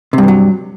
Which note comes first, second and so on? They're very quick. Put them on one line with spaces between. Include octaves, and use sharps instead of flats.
C3 G2 E3 F#3